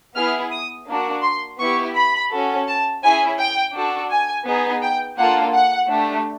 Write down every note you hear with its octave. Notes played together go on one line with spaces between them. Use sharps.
B3 E4 G#4 F6
D#6
A#3 D4 F#4
C6
B3 E4 G4 C#6
B5
C#4 F#4 A4
A5
C#4 E4 G#4 G#5
G5
D4 F#4 A4
G#5
B3 D#4 G#4
G5
A#3 D4 F4 A4 F#5
F#5
A3 D4 G4